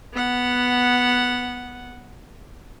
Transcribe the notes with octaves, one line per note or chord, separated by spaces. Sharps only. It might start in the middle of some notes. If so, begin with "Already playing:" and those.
B3 F#5